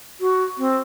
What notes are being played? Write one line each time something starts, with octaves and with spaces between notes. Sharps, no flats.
F#4
C4